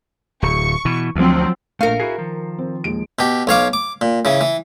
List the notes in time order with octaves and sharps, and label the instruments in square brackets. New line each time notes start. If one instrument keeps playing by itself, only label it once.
[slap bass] D1 [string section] C#6
[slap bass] B2 E3
[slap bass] D2 [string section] F3 F#3 C4
[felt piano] A#1 C#7 D#7 [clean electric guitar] A3 [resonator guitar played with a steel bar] A#4 F5
[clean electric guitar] E4 F#4 G#4 [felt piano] C7
[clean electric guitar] D#3 F3
[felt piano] C4
D#2 G#3 D7
[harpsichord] B2 G4
B1 C#5 F5 D6
D6
A#2
C#3 E3
E3